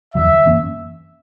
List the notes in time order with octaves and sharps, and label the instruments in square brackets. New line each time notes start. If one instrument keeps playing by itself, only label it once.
[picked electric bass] E2 D3 F#3 [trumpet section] E5
[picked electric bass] F#2 E3 A#3 C#4